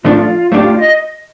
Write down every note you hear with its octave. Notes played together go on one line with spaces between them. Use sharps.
A2 F3 A3 D4 F4
A2 A3 D4 F4 G4
D#5